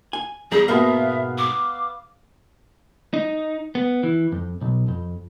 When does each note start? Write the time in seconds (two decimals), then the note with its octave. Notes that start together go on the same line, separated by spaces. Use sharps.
0.13 G#5
0.52 E2 G3 G#4 A#5
0.68 G#2 B2 A#3 B3 E5 F5
1.38 D6
3.14 D#4
3.75 B3
4.03 E3
4.32 F2
4.61 B1
4.88 F2